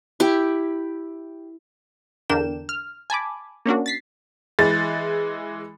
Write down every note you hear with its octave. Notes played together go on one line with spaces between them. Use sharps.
E4 G4
E2 D3 D4 A#4 G5 E7
F6
G#5 A5 B5 D6
A#3 C#4 D4 F#4
A6 B6 C7
E3 G#3 A6